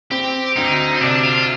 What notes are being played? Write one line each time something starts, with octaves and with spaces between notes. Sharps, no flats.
C4 G4
D2 D#4
C4
C3 D4
F4